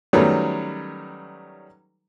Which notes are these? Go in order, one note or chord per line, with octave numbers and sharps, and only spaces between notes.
D#3 F#3 G3 A3 C#4 B4